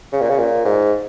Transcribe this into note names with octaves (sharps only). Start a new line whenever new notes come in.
C#3
A#2
C#3
A#2
G#2